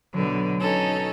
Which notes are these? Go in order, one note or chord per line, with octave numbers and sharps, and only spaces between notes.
B1 B2 D3 F#3
C#4 D#4 A4